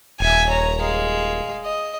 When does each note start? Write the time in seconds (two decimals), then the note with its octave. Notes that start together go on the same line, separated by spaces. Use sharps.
0.20 D#1 E5 G#5
0.49 C#5 A#5
0.81 G#3 F5
1.65 D#5